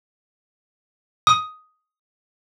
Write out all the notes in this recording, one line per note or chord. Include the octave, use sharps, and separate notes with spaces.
D#6